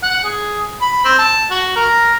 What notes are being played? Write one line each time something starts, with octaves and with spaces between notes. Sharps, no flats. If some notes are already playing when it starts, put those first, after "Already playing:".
F#5
G#4
B5
C4
A5
F#4
A#4